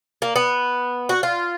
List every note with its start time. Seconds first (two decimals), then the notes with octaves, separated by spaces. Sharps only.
0.22 A#3
0.36 B3
1.09 F#4
1.23 F4